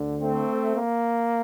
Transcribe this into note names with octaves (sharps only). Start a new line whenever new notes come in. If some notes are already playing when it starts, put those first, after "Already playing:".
Already playing: D2 D3
A3 C4
A#3